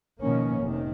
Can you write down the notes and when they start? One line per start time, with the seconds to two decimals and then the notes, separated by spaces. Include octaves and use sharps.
0.20 B2 D#3 F3 A#3 C#4
0.61 F1 C3 D#3